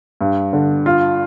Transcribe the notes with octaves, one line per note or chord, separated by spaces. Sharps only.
G2
D3
F4